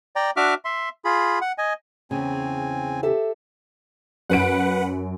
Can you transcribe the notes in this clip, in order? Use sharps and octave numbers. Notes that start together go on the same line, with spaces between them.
D5 G5 A#5
D4 F#4 E5 D6 F6
E5 C6
F4 G#4 B5
F#5
D#5 G#5
E2 C#3 C4 G#5
G4 A4 E5
F#2 B4 F#5 D7